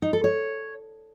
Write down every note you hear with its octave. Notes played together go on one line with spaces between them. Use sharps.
D#4
A4
C#5